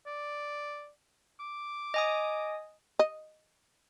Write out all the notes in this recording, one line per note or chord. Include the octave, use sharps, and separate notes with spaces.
D5
D6
D#5 G#5 D#6
D#5